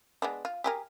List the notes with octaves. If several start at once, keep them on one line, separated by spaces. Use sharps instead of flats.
G#3 B3 D4
F4
G4 G#4 A#4